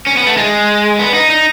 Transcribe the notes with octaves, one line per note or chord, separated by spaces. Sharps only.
C#4
B3
A3
G#3
B3
D#4
D#4